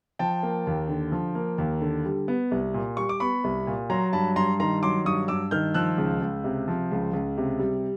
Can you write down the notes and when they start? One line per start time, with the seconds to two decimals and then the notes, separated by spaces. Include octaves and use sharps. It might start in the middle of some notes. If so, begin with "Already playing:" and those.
0.19 F3 G5 A5
0.43 A#3
0.67 D#2
0.89 D3
1.12 F3
1.35 A#3
1.58 D#2
1.82 D3
2.05 G3
2.28 B3
2.51 C2
2.74 A#2
2.97 G3 C#6
3.09 D6
3.20 B3 B5 C#6
3.44 C2
3.67 A#2
3.90 F#3 A#5 C6
4.13 G2 A5 B5
4.36 G2 A#5 C6
4.60 D#3 A#5 C6
4.83 F#3 C6 D6
5.05 G2 C#6 D#6
5.28 G2 D6 E6
5.51 D#3 F6 G6
5.74 F3 E6 F#6
5.98 C#2
6.21 C#2
6.44 C3
6.68 F3
6.91 C#2
7.13 C#2
7.37 C3
7.59 G3